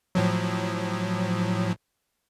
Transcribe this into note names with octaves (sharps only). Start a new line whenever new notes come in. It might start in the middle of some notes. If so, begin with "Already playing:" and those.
A2 F3 F#3